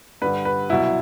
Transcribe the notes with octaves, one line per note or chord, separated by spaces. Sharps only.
G2 D3 G3 B4
B4
C2 B2 F#3 E4